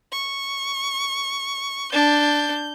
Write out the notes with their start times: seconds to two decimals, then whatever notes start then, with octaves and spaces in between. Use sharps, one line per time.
0.12 C#6
1.93 D4 G6